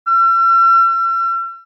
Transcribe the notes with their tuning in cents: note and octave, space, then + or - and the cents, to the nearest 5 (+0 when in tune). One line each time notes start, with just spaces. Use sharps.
E6 +45